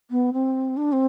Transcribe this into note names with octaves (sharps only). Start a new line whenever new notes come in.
B3
C4
D4
C4